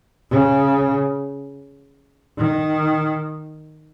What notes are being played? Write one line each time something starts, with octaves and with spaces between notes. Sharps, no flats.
C#3
D#3